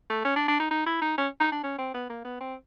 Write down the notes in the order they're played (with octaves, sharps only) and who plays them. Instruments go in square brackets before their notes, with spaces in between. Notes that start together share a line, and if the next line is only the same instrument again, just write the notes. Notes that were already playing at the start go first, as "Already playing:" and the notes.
[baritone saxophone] A3
C#4
D4
D4
D#4
D#4
E4
D#4
C#4
D#4
D4
C#4
C4
B3
A#3
B3
C4